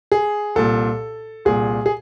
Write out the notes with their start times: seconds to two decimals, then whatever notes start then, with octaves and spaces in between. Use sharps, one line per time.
0.12 G#4
0.55 C2 A#2 A4
1.45 C2 A#2 G#4
1.86 G#4